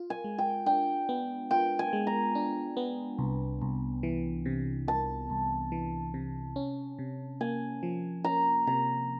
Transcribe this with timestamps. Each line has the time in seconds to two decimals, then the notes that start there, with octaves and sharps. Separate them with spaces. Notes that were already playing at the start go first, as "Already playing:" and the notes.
Already playing: F4
0.10 G#5
0.24 G#3
0.38 G5
0.66 D4 G5
1.09 B3
1.51 F4 G5
1.79 G#5
1.93 G#3
2.07 A#5
2.35 D4
2.77 B3
3.19 C2
3.62 C2
4.03 E3
4.46 C3
4.88 C2 A5
5.30 C2
5.72 E3
6.14 C3
6.56 C#4
6.99 C3
7.41 A#3 G#5
7.83 F3
8.24 C#4 A#5
8.67 C3 A#5